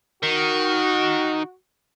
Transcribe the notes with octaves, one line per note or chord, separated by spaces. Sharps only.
D#3 F#4